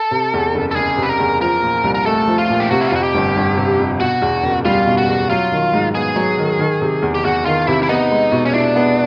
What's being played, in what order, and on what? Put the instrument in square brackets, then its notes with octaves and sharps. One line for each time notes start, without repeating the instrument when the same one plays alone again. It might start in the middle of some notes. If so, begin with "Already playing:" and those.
Already playing: [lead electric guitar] A4
[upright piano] C3
E2
F#1
[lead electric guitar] A4
[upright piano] F#1 [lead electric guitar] G#4
[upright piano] C3 [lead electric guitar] B4
[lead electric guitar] A#4
[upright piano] E2
[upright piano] F3 [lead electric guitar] A#4
[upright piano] A#2
C2
[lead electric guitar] A#4
[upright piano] A3 [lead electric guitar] A4
[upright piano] F3
[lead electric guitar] F4
[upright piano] A#2
[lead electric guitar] G4
[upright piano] C3 [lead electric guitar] F#4
[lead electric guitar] E4
F4
[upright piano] F2 [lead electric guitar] F#4
[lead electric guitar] G4
[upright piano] G1
G1
C3
F2
[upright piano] B2 [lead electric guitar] F#4
[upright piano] E2
F#1
[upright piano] G3 [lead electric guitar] F4
[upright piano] B2
[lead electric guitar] F#4
[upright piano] E2
[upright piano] F#3 [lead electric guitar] F4
[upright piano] D#3
G#2
[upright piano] B3 [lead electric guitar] G#4
[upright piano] F#3
D#3
D#3
C3
E2
[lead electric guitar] G4
[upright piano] E2 [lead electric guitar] F#4
[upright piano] D#3 [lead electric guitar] F4
[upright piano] C3 [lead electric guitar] E4
[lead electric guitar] E4
[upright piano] B3 [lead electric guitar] D#4
[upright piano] G#3
B2
[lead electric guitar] C#4
[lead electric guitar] D4 [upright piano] E4
[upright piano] B3